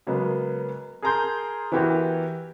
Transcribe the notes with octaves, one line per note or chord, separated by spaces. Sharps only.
C#3 F#3 G#3 A#3 B3
G#4 A#4 A5 A#5 C6 G6
E3 B3 E4 F#4 G4 A#4